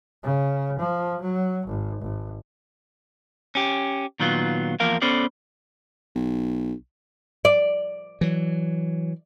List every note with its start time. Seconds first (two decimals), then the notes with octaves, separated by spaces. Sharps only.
0.23 C#3
0.79 F3
1.22 F#3
1.67 G#1
2.02 G#1
3.55 C#4 G4
4.20 A#2 D#3 F#3 B3 F4
4.80 E2 F3 A#3 A#4 F5
5.02 B3 C#4 A4 C5 D5
6.15 B1
7.45 D5
8.21 E3 F#3